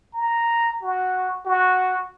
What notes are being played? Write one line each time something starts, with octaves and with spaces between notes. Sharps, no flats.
A#5
F#4
F#4